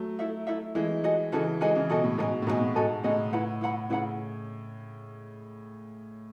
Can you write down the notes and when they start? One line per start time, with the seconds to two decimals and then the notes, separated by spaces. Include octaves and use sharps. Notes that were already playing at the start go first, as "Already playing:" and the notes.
Already playing: F#3 A3
0.19 E4 A4 E5
0.47 E4 A4 E5
0.75 E3 G#3 E4 A4 E5
1.04 F#4 A4 D#5 G#5
1.32 C#3 E3 F#4 A4 D#5 G#5
1.61 E3 G#3 F#4 A4 D#5 G#5
1.75 C#3 E3
1.89 B2 F#4 A4 D#5 G#5
2.04 A2
2.17 G#2 B2 F#4 A4 D#5 G#5
2.42 A2
2.47 G#2 B2 F#4 A4 D#5 G#5
2.61 A2
2.75 G#2 F#4 A4 D#5 G#5
3.03 A2 C#3 F#4 A4 D#5 G#5
3.33 E4 B4 F#5 B5
3.61 E4 B4 F#5 B5
3.90 A2 C#3 E4 B4 F#5 B5